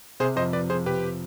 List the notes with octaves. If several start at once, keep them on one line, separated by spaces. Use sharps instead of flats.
C3 G#4 C5
F2 C5 D#5
F2 B4 D5
F3 G#4 C5
C3 G4 B4